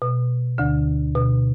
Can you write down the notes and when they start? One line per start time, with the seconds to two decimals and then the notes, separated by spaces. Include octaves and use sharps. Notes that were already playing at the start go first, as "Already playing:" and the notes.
0.02 B2
0.58 D2 D3
1.15 B2